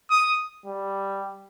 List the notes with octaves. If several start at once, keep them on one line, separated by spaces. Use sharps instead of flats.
D#6
G3